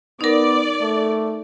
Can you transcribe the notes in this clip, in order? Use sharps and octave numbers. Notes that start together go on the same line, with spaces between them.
B3 D#4 A#4 D5
A3